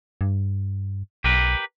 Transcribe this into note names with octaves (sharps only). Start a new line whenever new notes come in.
G2
B1 G4 A#4 B4